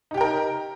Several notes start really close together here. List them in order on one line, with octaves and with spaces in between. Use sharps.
D#4 G4 G5 A#4